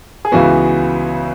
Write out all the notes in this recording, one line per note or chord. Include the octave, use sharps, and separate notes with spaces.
G#4
C#2 C#3 E3 B3 F#4